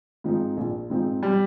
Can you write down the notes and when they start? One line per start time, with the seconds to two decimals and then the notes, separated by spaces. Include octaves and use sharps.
0.24 G#2 F3 C4 D#4
0.57 A#1
0.90 G#2 F3 C4 D#4
1.23 G3